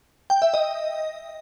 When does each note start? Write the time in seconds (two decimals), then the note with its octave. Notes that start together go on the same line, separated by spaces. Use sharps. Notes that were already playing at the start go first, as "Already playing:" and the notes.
0.30 G5
0.42 E5
0.54 D#5